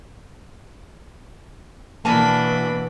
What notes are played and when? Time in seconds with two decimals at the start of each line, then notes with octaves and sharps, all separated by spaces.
2.05 B2 E3 A#3 D4 A#4 G#5 A5 B5